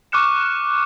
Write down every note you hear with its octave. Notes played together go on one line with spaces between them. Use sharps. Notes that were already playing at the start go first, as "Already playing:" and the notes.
C#6 D6 F6 F#6 C#7 E7